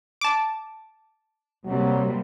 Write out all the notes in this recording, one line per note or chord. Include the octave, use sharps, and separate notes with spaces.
A5 D6
C3 F#3 G3 A#3